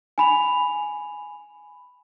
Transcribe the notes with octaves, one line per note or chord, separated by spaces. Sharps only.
G#5 B5 F7